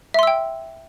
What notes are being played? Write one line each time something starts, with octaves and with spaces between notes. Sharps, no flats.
E5 G5 C6 E6